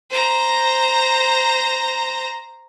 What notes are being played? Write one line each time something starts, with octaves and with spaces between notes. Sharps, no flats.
C5 A#5